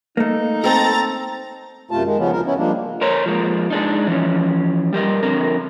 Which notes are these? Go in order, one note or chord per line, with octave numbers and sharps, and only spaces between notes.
A3 A#3 D#4
C4 A4 A#5 A6
F#2 C3 A3 F4 A5
D#3 G#3
C#3 F3 B3 C#4
D2 F3 A#4
B3 C#4 E4
F3 G3 G#3 A#3 D4
A#4 C5 C#5 A#5
F3 G#3 A#3
G#3 D4 D#4
E3 F3 C#4
G3 G4 A#4 D#5
F2 D3 C4 A#4